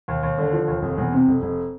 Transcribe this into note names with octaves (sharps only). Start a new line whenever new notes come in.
D#2
D#2
D3
F3
D#2
F1
E2
C3
F1
F1